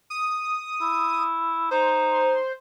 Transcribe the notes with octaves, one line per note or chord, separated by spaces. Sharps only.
D#6
E4
D#4 C5